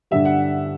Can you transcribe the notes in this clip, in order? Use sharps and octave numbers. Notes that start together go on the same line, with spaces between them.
G2 D3 G3 E5
F#5